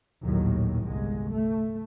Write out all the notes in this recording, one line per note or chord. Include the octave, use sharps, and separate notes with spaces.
A#1 D#2 A2 D#3 F#3
G1 C2 G#3
A3